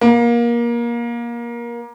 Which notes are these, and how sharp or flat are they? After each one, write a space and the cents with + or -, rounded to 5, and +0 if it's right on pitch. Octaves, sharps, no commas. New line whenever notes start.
A#3 +25